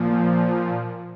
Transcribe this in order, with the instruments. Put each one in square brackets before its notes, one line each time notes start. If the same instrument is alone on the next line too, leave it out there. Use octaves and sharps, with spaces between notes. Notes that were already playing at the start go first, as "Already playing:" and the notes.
Already playing: [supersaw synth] A#2 F3